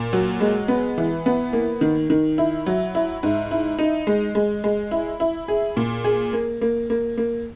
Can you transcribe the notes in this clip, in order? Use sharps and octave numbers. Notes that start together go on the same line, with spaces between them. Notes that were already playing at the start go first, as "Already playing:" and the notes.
Already playing: A#2
F#3
G#3
B3
E3
B3
A#3
D#3
D#3
E4
F#3
E4
G#2
E4
D#4
G#3
G#3
G#3
E4
E4
G#4
A#2
G#4
A#3
A#3
A#3
A#3